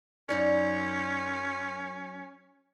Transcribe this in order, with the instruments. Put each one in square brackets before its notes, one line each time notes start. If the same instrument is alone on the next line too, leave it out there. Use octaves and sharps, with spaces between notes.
[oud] F#2 D#4 D5 [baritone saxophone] C#4